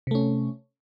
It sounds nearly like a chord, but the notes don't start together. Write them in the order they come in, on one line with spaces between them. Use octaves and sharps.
C3 A3 C#4